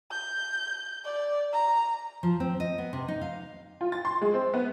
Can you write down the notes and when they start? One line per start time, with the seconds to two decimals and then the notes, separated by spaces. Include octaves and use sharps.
0.11 G6
1.05 D5
1.53 A#5
2.23 F3
2.40 C4
2.60 D#5
2.78 B3
2.93 C3
3.08 D#4
3.21 F5
3.81 F4
3.92 A6
4.05 C6
4.21 G#3
4.34 C4
4.54 B3